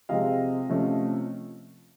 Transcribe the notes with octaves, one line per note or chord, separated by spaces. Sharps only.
C3 F3 G#3 C4 D#5 F5
C3 F3 A3 C#4